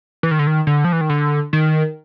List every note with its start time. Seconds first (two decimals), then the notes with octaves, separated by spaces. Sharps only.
0.23 E3
0.31 D#3
0.39 D3
0.47 D#3
0.67 D3
0.84 F3
0.93 E3
1.01 D#3
1.09 D3
1.53 D#3